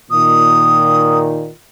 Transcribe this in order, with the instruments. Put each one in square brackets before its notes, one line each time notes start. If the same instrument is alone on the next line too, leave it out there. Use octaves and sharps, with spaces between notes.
[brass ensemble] A#2 D#3 [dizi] D#6